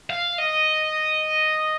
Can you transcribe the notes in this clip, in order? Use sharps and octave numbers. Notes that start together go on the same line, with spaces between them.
F5
D#5